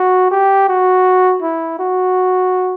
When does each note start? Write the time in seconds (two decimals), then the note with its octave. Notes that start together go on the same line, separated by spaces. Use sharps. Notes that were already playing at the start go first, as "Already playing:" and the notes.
Already playing: F#4
0.31 G4
0.69 F#4
1.42 E4
1.79 F#4